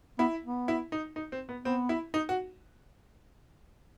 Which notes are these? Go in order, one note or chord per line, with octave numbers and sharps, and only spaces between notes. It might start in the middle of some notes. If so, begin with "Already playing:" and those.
B3 E4
B3
E4
D#4
D#4
C4
B3
B3 C4
E4
D#4
F#4